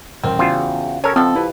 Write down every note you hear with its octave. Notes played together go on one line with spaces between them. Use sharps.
D#1 A1 C4 A#4
E2 C#3 F4 F#4 C5
C#4 A4 A#4 C#5
B2 F3 C4 A4
E4 G4 B4